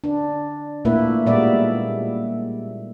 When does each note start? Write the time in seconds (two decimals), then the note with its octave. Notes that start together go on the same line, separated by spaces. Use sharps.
0.04 D4
0.85 A#2 A3 A#3 E4 B4 E5
1.26 A#2 G3 G#3 B3 D5 E5